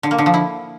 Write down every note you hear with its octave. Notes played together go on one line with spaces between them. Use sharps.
D3
A#3
D3
F3
E4